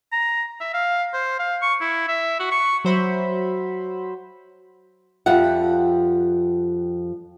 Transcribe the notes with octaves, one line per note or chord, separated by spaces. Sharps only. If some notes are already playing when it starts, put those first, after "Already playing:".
A#5
E5
F5
C5
F5
C#6
E4
E5
F#4
C#6
F#3 F#4 C5 E5 B5
F2 F3 G3 E5 F#5